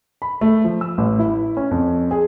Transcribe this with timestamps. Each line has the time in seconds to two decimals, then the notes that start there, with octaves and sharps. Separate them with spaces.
0.22 B5
0.41 A3
0.64 F3
0.81 E6
0.98 A1
1.19 E4
1.57 C#4
1.71 F2
2.11 G#4